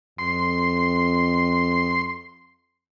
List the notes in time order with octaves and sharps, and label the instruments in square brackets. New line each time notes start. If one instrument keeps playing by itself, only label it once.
[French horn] F2 [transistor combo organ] C6